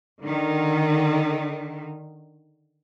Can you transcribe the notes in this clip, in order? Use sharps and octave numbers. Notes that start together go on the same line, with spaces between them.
D3 D#3